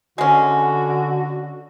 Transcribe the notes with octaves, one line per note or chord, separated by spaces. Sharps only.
D3 G#3 C#4 F#4